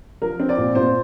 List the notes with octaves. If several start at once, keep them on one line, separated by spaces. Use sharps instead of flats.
F3 A#4
C4
D5
A#2
A#2 C5